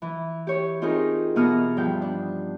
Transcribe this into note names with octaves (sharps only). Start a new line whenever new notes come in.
E3
G4 C#5
C4 D#4 F4 G4 G#4 A#4
B2 E3 B3 A#5 D#6 F6
G2 F3 G5
D4